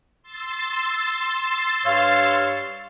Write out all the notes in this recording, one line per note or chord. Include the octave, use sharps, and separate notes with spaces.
C6 E6 A6
G2 C#5 F5